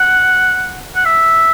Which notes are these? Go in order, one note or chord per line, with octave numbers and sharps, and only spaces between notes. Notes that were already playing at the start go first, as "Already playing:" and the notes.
Already playing: F#5
F#5
E5